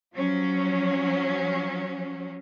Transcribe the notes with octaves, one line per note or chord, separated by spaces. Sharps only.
F3 F#3 C#4